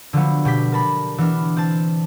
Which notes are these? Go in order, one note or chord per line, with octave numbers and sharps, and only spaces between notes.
D3 F3 F#3 B3
B2 G4 B6
A#4 A5 B5
E3 B3 D4 F6
C4 A5